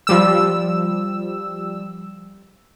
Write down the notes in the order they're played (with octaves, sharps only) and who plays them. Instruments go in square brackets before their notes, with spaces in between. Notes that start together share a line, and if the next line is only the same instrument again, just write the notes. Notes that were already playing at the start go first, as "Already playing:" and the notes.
[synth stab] F3 G3 E6